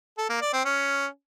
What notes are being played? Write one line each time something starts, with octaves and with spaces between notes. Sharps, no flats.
A4
A#3
D5
C4
C#4